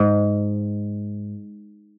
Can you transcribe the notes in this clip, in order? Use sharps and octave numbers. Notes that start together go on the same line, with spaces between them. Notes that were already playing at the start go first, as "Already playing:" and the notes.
Already playing: G#2